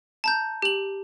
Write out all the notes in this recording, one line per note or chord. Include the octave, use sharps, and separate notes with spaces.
A5 A#5 G6
G4 F#7